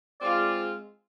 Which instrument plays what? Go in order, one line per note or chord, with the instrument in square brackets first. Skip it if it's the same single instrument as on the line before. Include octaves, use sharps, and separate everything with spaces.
[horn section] G#3 C4 F4 G#4 [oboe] D5